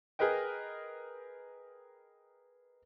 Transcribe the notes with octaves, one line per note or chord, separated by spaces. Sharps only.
G#4 A#4 B4 D#5 G5